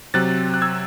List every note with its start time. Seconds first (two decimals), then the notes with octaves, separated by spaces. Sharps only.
0.14 C3 F#3 C4 F#6 A6
0.54 F#6
0.62 E6 G#6